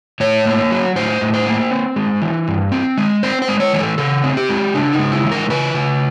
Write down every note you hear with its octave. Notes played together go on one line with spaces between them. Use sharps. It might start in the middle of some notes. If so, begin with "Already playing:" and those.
A2 C#5
A#3
F#3
A2 C5
A2
C5
A#3
C4
G#3
E3
G2
C4
G#3
C4 C5
C5
G#3
C#5
E3
A4
C#3 A4
C4
G4
G#3
C#3 D4
D#4
G#3
E4
E3
A#4
C#3 B4
C#3